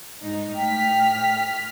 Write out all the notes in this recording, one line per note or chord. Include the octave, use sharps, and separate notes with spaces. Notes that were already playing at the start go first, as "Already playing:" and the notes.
G#2 D#4
A2 G5 F6 B6